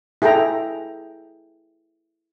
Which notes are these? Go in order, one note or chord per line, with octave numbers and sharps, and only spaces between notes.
E4 G#4 A4 G5 A#5